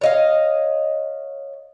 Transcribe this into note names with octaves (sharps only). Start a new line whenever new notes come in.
C#5 D#5 F5